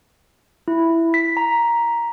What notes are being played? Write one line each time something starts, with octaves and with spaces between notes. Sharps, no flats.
E4
B6
A#5